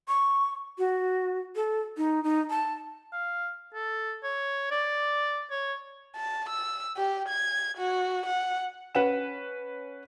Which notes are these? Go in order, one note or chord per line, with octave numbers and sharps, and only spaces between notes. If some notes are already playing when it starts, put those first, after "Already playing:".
C#6
F#4
A4
D#4
D#4
A5
F5
A4
C#5
D5
C#5
A5
E6
G4
G#6
F#4
F#5
C#4 B4 F#5 E7